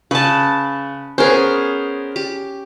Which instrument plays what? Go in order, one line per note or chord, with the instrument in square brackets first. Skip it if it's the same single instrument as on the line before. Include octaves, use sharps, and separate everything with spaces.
[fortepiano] C#3 [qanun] B4 A5
[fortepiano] B3 A#4 C5 [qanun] C#4 G#4
[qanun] G4